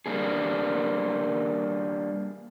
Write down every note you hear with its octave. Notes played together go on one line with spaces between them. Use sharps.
G3 A#3 D4 G#4